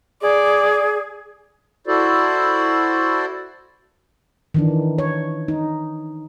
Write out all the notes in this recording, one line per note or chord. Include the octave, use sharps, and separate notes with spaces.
G#4 D5
E4 F#4 A4 C5 D5
D#3 E3 D4
C#5
D#4